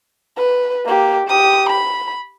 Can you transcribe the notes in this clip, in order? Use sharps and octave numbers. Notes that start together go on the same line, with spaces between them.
B4
A#3 G4
G4 D#6
B5